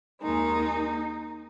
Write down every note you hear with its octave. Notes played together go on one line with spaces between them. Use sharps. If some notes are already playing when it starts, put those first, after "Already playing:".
D#2 D#3 G#3 D#4